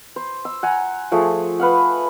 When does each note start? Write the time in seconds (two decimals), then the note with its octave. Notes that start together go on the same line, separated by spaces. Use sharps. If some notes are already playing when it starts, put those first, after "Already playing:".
0.16 C5
0.45 E6
0.63 F#5 G#5 A#5
1.12 F3 A3 G#4
1.59 B4 F5 F#5